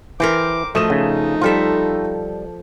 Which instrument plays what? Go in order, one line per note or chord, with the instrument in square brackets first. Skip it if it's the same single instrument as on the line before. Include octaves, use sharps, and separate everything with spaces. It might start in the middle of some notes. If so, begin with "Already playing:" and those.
[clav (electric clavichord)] E3 [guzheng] A#4 C5 G5 [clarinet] D6
[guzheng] F3 D#5 [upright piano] A3 D#6 E7 [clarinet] F#4
[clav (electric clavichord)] C#3 [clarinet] D#4
[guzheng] F3 A4 E5 [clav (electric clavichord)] G3 F4